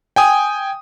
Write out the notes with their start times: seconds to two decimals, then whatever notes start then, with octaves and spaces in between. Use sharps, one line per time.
0.16 G5 G#5 D#6